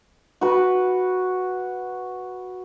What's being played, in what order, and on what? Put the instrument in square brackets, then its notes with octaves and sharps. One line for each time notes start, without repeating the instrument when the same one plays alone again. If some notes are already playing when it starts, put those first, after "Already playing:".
[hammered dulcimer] F#4 B4